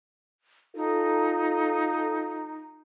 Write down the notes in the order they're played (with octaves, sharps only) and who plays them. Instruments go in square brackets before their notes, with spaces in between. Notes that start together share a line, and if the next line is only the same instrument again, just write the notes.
[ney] D#4 [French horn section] F4 A4